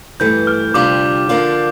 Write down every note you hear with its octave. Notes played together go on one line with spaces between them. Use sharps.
G2 E3 A3 G6
F6
D2 C3 G3 D4 F4 D6
D3 F3 A#3 D4 F4